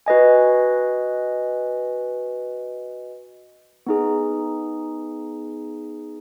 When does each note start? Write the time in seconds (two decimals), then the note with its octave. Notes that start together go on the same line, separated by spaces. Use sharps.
0.06 F#4 B4 D#5 G#5
3.86 B3 D#4 G#4